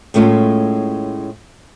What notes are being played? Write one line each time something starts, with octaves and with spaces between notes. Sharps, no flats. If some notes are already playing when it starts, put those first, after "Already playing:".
A2 G#3 A3 C#4 F4